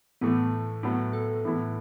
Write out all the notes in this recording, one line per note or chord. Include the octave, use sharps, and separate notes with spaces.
A2 E3 A3 B3
A2 F#3 B3
A4
A2 E3 B3 E4